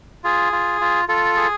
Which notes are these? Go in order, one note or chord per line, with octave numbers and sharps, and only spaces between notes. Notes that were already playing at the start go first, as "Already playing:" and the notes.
F4 G#4
F4
F4
F4 A4
G#4